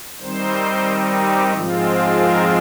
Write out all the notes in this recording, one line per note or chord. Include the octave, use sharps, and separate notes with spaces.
D#3 G3 C4 D#4 C5
G4
G#2 F3 G#3 C4 F4
A#4